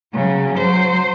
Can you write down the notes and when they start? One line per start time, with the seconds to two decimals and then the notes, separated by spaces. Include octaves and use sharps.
0.13 C#3 F#3
0.58 F#3 C5